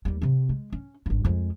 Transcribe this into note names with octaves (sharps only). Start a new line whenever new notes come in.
D#2 G3
C3 C4
G#3
C#4
G#1 G2
F2 G#3